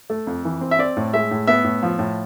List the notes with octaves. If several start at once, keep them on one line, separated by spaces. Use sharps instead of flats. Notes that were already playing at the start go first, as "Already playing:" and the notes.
A3
F2
E3
C4
E5
C4 D5
A2
G#3 E5
A2
B3 E5
A2
F3
A2